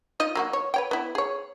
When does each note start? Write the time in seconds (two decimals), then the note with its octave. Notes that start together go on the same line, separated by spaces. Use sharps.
0.20 D#4 F4 D#5
0.35 F#3 A#3 F#4
0.53 C#5
0.74 B4 C#5 G5
0.91 B3 E4
1.15 G#4 C#5